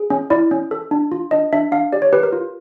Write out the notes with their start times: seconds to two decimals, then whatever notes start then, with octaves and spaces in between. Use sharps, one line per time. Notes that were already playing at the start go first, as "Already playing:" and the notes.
Already playing: G#4
0.10 C#4
0.30 E4 D5
0.51 C#4
0.71 A4
0.91 D4
1.12 F4
1.31 D4 D#5
1.53 D4 E5
1.72 D4 F5
1.93 G4 D5
2.02 C#5
2.13 G4 B4
2.23 A#4
2.33 F4